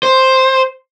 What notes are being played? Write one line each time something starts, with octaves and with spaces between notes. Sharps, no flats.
C5